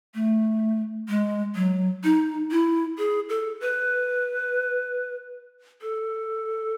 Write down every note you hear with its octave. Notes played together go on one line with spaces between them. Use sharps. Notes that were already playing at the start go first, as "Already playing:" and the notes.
A3
G#3
F#3
D#4
E4
G#4
A4
B4
A4